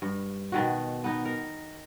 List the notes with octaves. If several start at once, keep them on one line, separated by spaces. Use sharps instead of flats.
G2
B2 D#3 F#4
B3 D#4
A#4